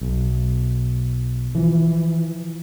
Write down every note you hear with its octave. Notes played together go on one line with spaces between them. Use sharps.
B1
E3 F3